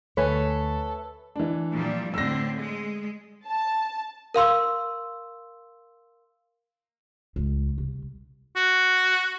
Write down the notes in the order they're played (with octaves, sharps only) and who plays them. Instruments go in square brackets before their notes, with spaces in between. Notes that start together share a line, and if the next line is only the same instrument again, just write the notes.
[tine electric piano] D2 [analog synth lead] A4 [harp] B4 [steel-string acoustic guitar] C#5 E5 G#5
[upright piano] E3 D4
[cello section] A#2 F3 G3
[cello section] A2 D3 C4 [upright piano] E6 A#6
[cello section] G#3
[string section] A5
[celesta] A#4 F5 C6 E6
[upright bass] C#2
C2
[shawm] F#4